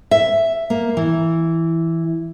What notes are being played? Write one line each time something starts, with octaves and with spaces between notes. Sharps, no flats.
E5
A#3
E3